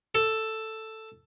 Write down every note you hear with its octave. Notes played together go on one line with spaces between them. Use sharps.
A4